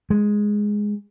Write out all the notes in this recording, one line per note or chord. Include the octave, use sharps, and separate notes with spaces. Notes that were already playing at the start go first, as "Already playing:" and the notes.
G#3